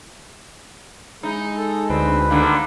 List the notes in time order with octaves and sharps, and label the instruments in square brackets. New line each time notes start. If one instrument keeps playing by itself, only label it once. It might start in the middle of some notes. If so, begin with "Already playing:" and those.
[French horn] G#3 [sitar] D#4 [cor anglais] E4
[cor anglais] A4
[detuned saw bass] D2 [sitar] C4 [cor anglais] B4
[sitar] D3 D#3 A#3